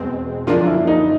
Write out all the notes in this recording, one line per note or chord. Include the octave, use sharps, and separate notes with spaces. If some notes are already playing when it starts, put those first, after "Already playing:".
Already playing: E2 B2 G#3 C4
F#2 D3 F3 A#3 D4 F4
E4
D#4